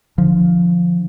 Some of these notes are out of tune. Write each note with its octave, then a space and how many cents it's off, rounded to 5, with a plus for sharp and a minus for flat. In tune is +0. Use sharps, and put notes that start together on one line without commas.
D3 +25 F3 +0